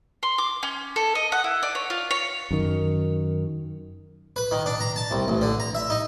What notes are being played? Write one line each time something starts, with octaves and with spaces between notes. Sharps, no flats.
C6
D6
C#4
A4
D#5
F#5
E4
D5
C#5
F4
C#5
F#2 D#3
B4
D#3
D4
A#5
A5
C2
A1
D3
A#5
E5
D#4